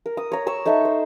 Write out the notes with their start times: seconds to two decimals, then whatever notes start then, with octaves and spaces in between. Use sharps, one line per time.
0.06 A#4
0.17 D#6
0.32 C#5 A#5
0.47 A#5 C#6 E6
0.66 D#4 A4 D#5 E5
0.85 C5